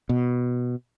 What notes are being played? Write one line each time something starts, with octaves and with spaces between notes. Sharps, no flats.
B2